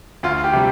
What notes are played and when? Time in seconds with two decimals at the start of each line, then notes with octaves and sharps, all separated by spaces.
0.23 D2 F4
0.44 G4
0.53 C3 G3